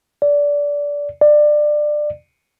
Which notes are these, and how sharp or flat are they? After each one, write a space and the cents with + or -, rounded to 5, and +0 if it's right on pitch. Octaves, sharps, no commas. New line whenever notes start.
D5 -20
D5 +20